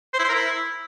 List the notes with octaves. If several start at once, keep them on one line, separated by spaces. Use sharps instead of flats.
C5
E4
C5
A#4
E4